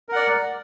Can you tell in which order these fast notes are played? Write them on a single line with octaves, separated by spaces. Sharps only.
A#4 F#5 D5